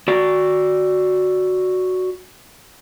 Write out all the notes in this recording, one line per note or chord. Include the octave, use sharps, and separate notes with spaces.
F#4 D5